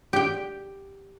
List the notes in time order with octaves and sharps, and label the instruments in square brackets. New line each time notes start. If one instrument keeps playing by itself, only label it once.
[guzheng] G4 G5